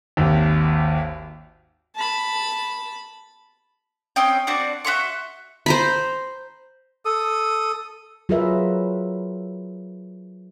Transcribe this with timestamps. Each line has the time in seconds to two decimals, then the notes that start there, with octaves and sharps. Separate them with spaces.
0.17 G#1 D#2
1.96 A5 B5
4.16 C4 C#4 D#5 G5
4.47 C4 D4 F#4 D5
4.85 F#4 E5 C6 C#6
5.66 C5 A#5 B5
7.05 A4 D#6
8.29 F#3 F4 G#4 A#4 B4 E5